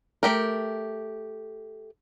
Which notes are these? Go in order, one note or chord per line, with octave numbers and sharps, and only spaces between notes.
A3 G4 A#4